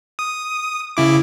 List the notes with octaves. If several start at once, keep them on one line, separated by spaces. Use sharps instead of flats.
D#6
C#3 E4 D6